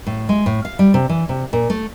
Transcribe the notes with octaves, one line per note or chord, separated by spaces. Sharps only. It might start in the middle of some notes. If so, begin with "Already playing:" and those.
A2
G#3
A2
F5
G3
C3
E3
C3
A#2
A3